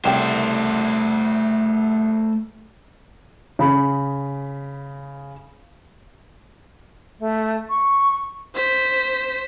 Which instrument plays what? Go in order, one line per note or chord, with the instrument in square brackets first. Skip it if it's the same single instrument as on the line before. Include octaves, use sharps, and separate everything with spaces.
[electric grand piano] C2 [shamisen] C#3 G4 G5 [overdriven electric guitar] A3 C5
[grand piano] C#3 B5
[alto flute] A3
C#6
[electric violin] C5 B6